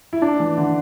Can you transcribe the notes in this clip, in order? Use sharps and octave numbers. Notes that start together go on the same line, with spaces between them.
E4
D4
E3
D3